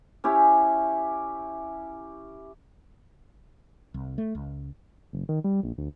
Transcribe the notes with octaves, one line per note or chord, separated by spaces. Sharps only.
C#4 E4 G4
C2
A3
C#2
F#1
D#3
G3
A#1
D2